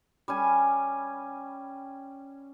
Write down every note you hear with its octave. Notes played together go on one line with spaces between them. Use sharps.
G3 C#4 G#5